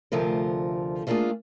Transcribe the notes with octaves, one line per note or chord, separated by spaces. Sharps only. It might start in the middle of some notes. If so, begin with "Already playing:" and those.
D2 C3 F3 A3 F4 A#4
A3 A#3 D4 D#4 F4 G#4